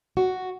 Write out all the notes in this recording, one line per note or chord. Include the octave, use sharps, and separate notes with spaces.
F#4